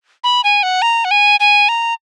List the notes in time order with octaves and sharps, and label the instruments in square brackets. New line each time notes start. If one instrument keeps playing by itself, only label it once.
[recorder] B5
G#5
F#5
A#5
F#5
G#5
G#5
A#5